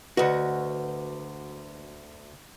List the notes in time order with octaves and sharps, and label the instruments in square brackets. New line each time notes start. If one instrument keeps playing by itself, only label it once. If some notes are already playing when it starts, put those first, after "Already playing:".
[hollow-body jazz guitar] D2 F#4 [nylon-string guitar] B4 D#5 F#5